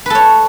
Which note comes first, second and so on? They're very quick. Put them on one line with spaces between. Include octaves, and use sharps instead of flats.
B4 A4 C#5